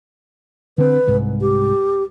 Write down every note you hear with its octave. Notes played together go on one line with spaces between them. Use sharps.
D3 C4 B4
C2 G#2
G4